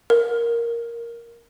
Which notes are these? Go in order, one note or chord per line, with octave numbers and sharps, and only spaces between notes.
A#4